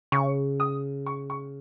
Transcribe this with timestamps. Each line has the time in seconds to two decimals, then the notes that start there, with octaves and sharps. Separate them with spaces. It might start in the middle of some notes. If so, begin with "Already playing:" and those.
0.12 C#3 C#6
0.60 D#6
1.06 C#6
1.30 C#6